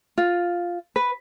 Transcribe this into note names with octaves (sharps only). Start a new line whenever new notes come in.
F4
B4